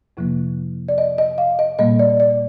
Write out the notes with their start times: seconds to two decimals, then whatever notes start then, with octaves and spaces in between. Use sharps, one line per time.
0.17 F2 C3 F3 A#3
0.89 D5
0.98 D#5
1.18 D#5
1.38 F5
1.59 D#5
1.79 A#2 G3 A#3 D#5
1.99 D5
2.20 D5